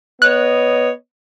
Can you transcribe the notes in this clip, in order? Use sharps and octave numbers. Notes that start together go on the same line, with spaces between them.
B3 C#5 D#5 F#6